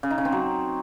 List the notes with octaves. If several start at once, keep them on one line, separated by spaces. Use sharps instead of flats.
C#3
D#4
C#3
C4
F#3